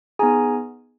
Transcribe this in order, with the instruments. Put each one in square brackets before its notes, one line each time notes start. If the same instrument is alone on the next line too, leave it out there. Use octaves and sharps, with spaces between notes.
[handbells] B3 D#4 G#4 G#5 A#5